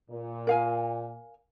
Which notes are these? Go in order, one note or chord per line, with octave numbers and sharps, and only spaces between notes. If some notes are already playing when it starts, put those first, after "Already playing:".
A#2
A#4 F5 G#5